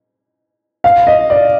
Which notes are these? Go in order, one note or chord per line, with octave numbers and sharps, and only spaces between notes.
F5
D#5
D5